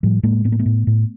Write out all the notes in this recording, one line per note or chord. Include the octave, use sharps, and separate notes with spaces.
A2 F3 G3
A2 G#3 A#3
A2 B3
A#3
A3 B3
A2
A2